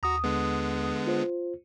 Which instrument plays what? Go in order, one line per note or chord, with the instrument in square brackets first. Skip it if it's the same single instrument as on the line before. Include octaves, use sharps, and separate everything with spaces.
[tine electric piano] D#2 D#6 [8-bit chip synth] F#4 A#5
[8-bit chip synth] D3 G#3 B3
[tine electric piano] F4 C5